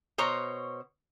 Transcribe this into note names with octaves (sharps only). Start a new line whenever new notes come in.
B2 C5 C#5 A#5